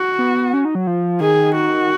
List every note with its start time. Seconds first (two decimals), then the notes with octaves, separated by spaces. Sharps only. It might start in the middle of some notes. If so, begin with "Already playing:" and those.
Already playing: F#4
0.19 B3
0.54 C#4
0.65 D#4
0.75 F#3
0.87 F3
1.20 D#3 G#4
1.55 F#4